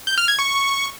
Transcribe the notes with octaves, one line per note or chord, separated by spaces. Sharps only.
G6
F6
G#6
C#6